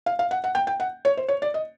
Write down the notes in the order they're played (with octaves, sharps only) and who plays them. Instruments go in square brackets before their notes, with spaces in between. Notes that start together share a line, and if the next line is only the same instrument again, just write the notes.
[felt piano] F5
F5
F#5
F#5
G5
G5
F#5
C#5
C5
C#5
D5
D#5